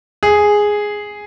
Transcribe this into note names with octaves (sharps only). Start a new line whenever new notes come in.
G#4